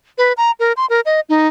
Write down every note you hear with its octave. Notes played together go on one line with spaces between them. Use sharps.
B4
A#5
A#4
C6
A#4
D#5
D#4